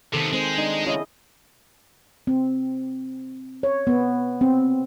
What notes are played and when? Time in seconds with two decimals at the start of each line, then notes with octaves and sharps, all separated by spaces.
0.13 C3 D#3 B3 A4
0.33 G#3 C4 C5
0.58 D4 D#4
0.86 C#3 E4 G#4 D#5
2.27 C4
3.63 C#5
3.87 B3
4.41 C4